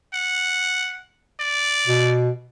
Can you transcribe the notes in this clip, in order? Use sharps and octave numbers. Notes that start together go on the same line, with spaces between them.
F#5
D5
B2